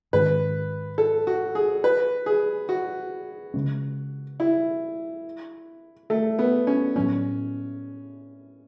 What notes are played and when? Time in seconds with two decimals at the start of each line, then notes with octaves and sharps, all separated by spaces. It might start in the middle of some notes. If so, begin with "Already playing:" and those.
0.13 G#2 D#3 G#3 C#4 B4
0.98 A4
1.27 F#4
1.55 G#4
1.84 B4
2.26 G#4
2.69 F#4
3.54 C#3 G#3 C#4
4.40 E4
6.10 A3
6.39 B3
6.67 C#4
6.96 A2 F#3 B3 C#4